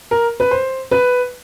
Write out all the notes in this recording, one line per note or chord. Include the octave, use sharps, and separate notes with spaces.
A#4
B4
C5
B4